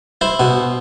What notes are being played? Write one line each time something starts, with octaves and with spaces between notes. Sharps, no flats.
E4 C5
B2